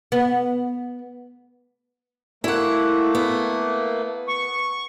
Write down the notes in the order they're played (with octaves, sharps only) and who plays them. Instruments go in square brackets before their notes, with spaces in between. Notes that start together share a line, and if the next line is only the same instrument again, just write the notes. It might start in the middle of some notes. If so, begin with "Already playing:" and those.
[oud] B3
[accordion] A3 A#3 [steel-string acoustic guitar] E4 F#5
[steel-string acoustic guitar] B3
[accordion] C#6